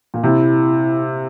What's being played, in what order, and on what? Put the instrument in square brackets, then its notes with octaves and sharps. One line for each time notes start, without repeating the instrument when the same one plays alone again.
[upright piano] A#2
[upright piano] C3 [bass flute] E4